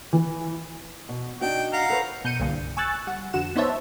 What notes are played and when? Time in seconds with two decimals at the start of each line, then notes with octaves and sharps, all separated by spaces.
0.13 E3
1.09 B2
1.41 D4 D#4 F#4 G5
1.73 F5 F#5 A#5
1.90 A4 B4 C#5
2.24 B2 G6 C#7 D#7
2.40 C2 G2 A#2 D3
2.77 G#5 C#6 E6 F#6 A6
3.07 G3 F#5
3.33 F2 D3 F#4 F#5 E7
3.56 B3 D#4 C5 C#5 E5 A5